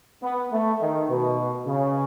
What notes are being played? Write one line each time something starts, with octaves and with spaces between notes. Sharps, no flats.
B3
A3
D#3
B2
C#3